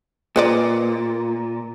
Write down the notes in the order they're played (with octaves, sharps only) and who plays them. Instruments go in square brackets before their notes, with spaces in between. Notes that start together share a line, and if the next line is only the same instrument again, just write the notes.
[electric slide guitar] A#2 [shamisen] B4 C5 D5